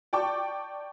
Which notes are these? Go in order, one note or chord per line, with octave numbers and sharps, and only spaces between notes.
D5 G5 A5 C#6 D6